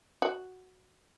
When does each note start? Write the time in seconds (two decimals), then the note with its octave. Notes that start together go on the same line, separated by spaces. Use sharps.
0.22 F#4